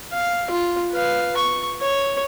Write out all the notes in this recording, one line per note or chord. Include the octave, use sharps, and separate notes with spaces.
F5
F4
B4 F5
C#6
C#5